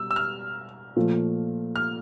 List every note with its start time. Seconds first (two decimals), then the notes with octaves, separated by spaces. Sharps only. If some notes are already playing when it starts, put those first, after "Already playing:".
Already playing: B2 G3 E6
0.11 E6
0.16 F6
0.96 A#2 F3 A3
1.76 F6